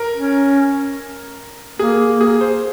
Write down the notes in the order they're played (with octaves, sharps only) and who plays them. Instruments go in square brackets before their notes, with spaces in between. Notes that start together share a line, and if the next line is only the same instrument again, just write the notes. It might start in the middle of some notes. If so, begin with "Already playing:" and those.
Already playing: [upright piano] A#4
[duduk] C#4
[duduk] A#3 [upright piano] G#4
[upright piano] G#4
C5